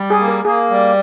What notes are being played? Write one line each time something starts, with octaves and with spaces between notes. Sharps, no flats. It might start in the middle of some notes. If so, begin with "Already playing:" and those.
Already playing: G3
G#4
A#3
A#4
A#3 G#4
G3